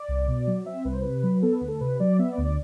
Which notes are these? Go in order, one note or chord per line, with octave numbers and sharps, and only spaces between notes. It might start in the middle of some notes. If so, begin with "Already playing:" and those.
Already playing: D5
C2
B2
F#3
C4 E5
C2 B4
C5
C3 B4
F#3
B3 A4
B4
D2
A4
C3 B4
F#3 D5
B3 E5
D5
D2
D5